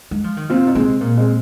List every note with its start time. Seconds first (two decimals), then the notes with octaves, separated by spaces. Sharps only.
0.11 G#3
0.24 F3
0.37 D#3
0.49 C3 C4 F4
0.67 A#2 D#4
0.75 C3 G#3 C4
1.01 A#2 A#3
1.17 G#3 C4